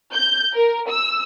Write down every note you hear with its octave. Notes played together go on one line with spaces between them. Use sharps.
G6
A#4
E6